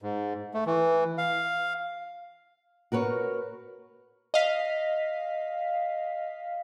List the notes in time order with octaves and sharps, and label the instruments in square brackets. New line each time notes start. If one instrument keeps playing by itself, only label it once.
[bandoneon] G#2
A3
E3
F5
[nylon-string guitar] F#4 A#4 B4 C#5
[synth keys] D#5 F5 B6